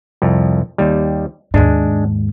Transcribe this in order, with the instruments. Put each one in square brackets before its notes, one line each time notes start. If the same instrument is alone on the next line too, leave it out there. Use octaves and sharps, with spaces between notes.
[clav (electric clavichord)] C2 F2
D#2 G3
[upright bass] D#2 G#2 [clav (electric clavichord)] G#3 D4